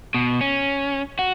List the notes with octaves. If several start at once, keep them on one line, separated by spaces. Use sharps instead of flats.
B2
C#4
F#4